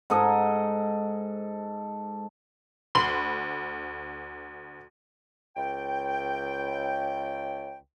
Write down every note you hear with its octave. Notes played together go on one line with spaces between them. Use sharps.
G#2 A4 D#5
D2 B5 C6 F#7
C#2 G5